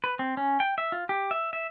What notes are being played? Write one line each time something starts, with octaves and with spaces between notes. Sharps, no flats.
B4
C4
C#4
G5
E5
F4
G4
E5
E5